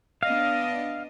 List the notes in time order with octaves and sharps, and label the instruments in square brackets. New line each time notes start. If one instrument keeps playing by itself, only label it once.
[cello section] B3 D4 D#5 [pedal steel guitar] F5